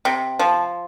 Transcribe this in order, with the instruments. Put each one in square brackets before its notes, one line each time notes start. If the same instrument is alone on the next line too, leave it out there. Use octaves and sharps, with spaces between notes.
[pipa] C3
F3